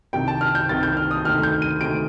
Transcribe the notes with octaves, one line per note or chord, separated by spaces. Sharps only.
C2 C3 D#3 G5
A5
F6
G6
C2 C3 D#3 A6
G6
F6
D#6
D2 C3 D#3 F6
G6
D#7
D2 C3 D#3 D7